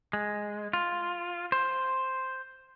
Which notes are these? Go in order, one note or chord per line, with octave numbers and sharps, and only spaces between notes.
G#3
F4
C5